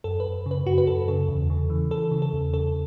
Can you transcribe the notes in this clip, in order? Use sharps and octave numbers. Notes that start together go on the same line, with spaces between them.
F#2 A4
B4
F#2
C#3
B4
F#2 F#4
B4
F#2 A4
C#3 A4
E2
C#3
E3
E3 A4
C#3
A4
E2
C#3 A4